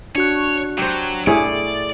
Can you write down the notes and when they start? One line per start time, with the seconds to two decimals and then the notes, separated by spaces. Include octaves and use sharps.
0.15 D4 F#4 C#5 F#6
0.78 F#3 G4 C5
1.27 A2 E4 G#4 C#5 D5